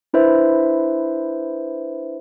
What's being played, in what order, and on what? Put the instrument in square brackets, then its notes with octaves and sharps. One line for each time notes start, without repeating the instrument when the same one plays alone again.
[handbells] D4 E4 B4 C5 E5